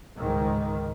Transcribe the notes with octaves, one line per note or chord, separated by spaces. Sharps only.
C#2 G#2 D#3